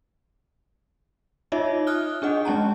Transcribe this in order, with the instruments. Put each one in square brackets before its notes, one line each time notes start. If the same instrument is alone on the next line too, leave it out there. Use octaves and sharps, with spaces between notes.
[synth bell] D#4 F4 C#5 D#5 E5
D#6 F6 F#6 G7
D4 G#4 D#5 F#5
G#3 C#4 A5 A#5